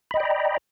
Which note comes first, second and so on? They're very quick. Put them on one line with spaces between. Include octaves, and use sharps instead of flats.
B5 D#5 G5 D5 A#5